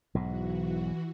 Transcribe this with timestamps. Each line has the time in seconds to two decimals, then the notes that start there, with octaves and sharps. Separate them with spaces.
0.15 B1 G#2 E3 F#4